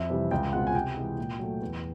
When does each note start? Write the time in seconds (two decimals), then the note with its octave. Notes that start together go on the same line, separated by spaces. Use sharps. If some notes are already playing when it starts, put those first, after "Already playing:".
Already playing: F2 E5
0.10 C3 E3 G3
0.31 C#2 G5
0.52 B2 G#3 C4 F4 F#5
0.67 G#5
0.74 C3 G5
0.97 E3 G#3
1.18 A#2
1.39 F#3 A3
1.61 E2